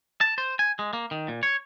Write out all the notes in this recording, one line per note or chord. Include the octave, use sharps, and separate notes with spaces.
A5
C5
G#5
G#3
A#3
D#3
A#2
C#5